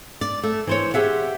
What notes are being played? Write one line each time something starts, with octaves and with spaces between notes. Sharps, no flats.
D5
A3
E3 C5 C#5
G4 G#4 E5 F#5